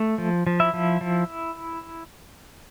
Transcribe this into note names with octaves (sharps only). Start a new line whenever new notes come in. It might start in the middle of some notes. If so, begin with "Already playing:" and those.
Already playing: A3
F3
F3
E4 E5
F3
F3